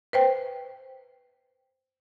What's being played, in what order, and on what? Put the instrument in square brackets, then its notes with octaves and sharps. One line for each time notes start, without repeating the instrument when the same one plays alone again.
[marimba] B4 C5 G5